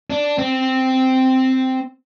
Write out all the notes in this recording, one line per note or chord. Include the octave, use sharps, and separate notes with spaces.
D4
C4